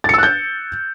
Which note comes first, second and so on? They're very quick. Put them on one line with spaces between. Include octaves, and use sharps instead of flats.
A6 C#7 E6 F#6 G6